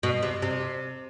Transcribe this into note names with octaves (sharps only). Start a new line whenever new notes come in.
B2
C3
C3